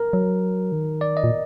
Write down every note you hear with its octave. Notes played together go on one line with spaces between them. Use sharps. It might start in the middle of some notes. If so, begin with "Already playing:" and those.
Already playing: A#4
F#3
D#3
D5
D#5
A#2